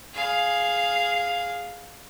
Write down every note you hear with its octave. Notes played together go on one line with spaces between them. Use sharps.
G#4 F5